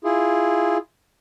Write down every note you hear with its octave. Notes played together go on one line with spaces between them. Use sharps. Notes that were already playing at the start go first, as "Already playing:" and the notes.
E4 F4 G#4